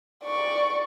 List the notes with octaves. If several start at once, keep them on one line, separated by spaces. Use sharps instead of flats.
D5 C#6